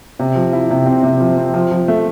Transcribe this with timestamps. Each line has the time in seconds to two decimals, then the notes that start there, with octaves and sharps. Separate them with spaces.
0.19 C3
0.35 F3
0.53 E4
0.70 C3
0.86 C4
1.03 C3
1.20 F3
1.37 C4
1.54 F3
1.71 F3
1.88 A3